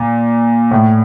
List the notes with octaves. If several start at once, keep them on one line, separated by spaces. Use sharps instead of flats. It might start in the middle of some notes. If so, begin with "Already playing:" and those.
Already playing: A#2
A2